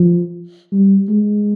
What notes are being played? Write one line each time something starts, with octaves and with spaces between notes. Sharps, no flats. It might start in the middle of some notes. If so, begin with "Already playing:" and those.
Already playing: F3
G3
G#3